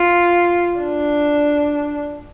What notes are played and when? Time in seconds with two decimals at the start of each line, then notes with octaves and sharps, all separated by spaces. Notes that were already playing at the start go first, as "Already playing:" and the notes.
Already playing: F4
0.79 D4